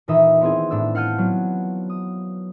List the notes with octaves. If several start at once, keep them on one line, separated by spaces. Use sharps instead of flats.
D#1 A#2 E3 D#4 E5 D#6
B3 C4 E4 G#4
A2 D4 E6
F5 F#5 A5 F6 G6 D#7
F#3 B3
D#6